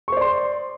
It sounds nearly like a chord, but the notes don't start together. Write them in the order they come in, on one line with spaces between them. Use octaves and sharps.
C#6 C5 D5 C6